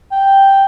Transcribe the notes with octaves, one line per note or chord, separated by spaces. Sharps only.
G5